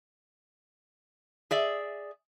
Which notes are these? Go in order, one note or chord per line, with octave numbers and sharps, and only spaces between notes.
G#4 D5 E5